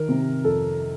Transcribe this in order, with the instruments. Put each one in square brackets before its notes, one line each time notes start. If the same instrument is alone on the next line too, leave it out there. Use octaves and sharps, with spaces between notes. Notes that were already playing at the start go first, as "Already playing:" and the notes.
Already playing: [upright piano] D#3 A#4
C3
F2 A4